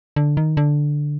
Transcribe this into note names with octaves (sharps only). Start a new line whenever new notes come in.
D3
D#3
D3